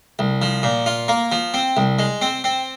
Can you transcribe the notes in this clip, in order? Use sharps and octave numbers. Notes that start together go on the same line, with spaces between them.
C2
F3
A#2
F4
A#3
F3
C4
C2
G#3
C4
C4